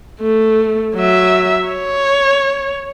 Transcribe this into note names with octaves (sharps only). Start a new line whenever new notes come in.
A3
F#3 E5
C#5